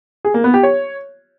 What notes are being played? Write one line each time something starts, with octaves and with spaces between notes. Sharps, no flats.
G#4
A#3
B3
G4
C#5